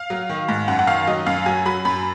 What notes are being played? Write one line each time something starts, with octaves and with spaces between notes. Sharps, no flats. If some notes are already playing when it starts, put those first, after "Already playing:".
Already playing: F5
F#3
D#3
G#2
F#2 F#5
F#5
D#3 F5
F#3 D#5
F#2 F5
F#3 G#5
F#3 B5
F#2 B5